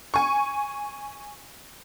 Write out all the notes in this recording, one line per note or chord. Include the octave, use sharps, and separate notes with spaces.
G#5 C#6